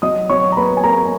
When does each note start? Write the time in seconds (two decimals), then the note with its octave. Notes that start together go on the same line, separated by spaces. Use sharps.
0.02 F#3 D#5 D#6
0.30 F#3 C#5 C#6
0.52 A#5
0.57 A#3 B4 B5
0.77 G#5
0.84 A#3 A#4 A#5